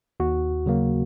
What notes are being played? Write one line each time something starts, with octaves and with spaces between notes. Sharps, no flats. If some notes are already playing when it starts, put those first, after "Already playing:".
D#2 F#4
C#3 F#3 A#3